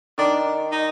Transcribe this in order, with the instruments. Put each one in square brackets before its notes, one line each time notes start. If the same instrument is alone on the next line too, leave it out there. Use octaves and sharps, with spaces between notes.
[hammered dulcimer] D#3 [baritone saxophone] D4
[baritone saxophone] D#4